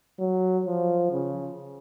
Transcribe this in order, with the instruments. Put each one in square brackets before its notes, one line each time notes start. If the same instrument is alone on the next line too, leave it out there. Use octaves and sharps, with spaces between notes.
[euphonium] F#3
F3
C#3